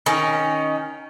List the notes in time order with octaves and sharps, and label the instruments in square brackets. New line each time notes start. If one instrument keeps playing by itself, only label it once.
[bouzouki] D#3 C#4